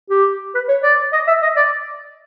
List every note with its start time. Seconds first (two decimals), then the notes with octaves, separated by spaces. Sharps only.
0.10 G4
0.55 B4
0.68 C#5
0.83 D5
1.13 D#5
1.27 E5
1.42 D#5
1.56 D5